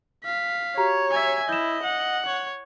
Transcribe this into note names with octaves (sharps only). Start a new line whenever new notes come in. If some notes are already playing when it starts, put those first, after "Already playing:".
F5 B6
F#4 G4 C#5 A#5
E5 G#5
E4 D#5 G6 E7
F#5
C#5